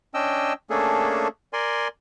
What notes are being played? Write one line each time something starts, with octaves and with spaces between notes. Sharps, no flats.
C#4 D4 D#5 G5 E6
A3 A#3 C#4 D4 G#4 A4
A#4 D5 G#5 C6